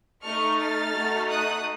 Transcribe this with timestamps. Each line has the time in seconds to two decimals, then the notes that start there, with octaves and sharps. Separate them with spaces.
0.22 A3 D#4 A4 C#6 F6
0.57 F6 A6
0.93 A3 D#4 F#4 A4
1.28 D#6 F#6